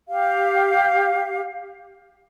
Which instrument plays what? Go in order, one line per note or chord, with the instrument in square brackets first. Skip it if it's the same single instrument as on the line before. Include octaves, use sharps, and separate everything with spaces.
[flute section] G4 F5